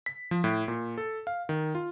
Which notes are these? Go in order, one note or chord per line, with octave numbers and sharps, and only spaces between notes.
B6
F3
A2
A#2
A4
F5
D#3
F4